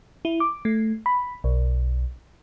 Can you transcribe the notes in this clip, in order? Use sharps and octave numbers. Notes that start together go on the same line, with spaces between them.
E4
D6
A3
B5
B1